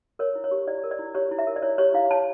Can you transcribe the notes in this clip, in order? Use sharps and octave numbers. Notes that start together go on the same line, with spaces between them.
A#4 C#5
E4
C#5
G4
E4 D5
A#4
D5
E4
G4 C#5
E4
E5
A#4
D5
E4 C#5
G4 C#5
E4 F5
C#5 A5